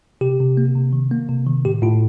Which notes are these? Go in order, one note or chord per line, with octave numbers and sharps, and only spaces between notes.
C3 G4
C3
A#3
C3
D#3
A#3
C3
D#3
A2 G4
A2 F4